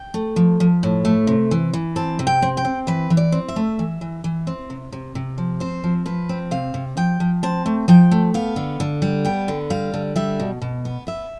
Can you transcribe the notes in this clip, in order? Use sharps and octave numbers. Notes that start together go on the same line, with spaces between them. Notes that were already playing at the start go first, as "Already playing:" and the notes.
Already playing: G5
A3
F3
F3
A2
A3
C3
E3
E3
C4 A5
C3
G5
C4
G5
C4
E3 B4
E3
D5
C4
E5
A3
E3
E3
E3
C4
C3
C3
C3
F3
C4 C5
F3
F3 B4
C4
C3 F5
C3
F3 G5
F3
C4 A5
A3
F3 G5
A3
B3 F5
D3
D3
G3
B3 G5
D3
G3 F5
D3
G3 E5
B2
B2
B3
B3 E5